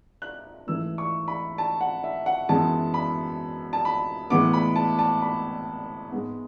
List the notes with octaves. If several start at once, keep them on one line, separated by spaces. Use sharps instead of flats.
F#6
G#2 E3 A3 E6
C#6
B5
A5
F#5
E5
F#5
F#2 E3 G#3 B3 A5
B5
A5
B5
A2 E3 G#3 B3 D6
B5
A5
A5
B5
G#2 G#3 B3